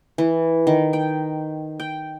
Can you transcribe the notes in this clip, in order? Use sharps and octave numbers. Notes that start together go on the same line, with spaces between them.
E3
D#3
G5
G5